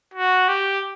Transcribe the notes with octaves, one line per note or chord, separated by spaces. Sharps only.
F#4
G4